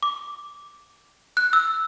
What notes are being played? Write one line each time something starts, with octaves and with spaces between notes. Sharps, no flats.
D6
F#6
E6